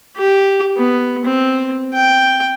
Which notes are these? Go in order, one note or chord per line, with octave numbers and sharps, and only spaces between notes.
G4
B3
C4
G5